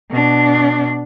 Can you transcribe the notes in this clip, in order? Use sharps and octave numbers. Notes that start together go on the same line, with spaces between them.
B2 D4